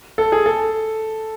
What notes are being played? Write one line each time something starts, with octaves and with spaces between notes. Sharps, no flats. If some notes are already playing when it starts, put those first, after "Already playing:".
A4
G#4
A4